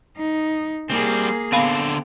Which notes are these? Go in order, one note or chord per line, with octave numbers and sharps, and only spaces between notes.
D#4
G3 A#3 C4 G#4
D3 B3 C4 F5 B5